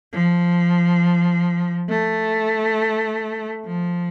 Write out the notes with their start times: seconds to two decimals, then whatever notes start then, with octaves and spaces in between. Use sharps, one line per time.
0.12 F3
1.89 A3
3.65 F3